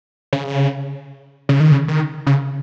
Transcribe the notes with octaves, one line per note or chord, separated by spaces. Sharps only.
C#3
C#3
D#3
C#3
D#3
C#3